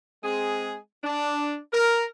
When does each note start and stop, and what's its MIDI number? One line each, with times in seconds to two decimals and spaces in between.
0.24 0.77 56
0.24 0.77 60
0.24 0.77 68
1.04 1.58 62
1.73 2.06 70